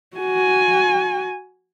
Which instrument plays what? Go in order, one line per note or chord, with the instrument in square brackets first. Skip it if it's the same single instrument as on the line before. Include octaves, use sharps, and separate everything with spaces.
[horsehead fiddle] F#4 G#5